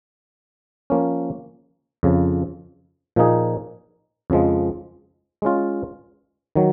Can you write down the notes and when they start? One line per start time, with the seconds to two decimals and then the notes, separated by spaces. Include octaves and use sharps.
0.90 F3 A#3 C#4
2.03 F2 C#3 F3
3.16 A#2 F3 A#3 D#4 G#4
4.30 F2 C#3 F3 G#3
5.42 G#3 C#4 F4
6.55 D#3 F#3